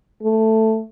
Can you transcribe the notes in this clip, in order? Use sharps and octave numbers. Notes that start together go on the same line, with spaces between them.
A3